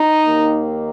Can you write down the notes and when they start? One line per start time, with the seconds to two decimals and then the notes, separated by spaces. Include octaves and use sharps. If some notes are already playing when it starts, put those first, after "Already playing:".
Already playing: D#4
0.25 D#2 D#3 A#3